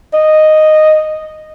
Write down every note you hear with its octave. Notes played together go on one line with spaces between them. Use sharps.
D#5